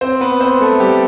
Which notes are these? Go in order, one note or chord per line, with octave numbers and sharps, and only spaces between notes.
C4 C5
B3 B4
C4 C5
A3 A4
G3 G4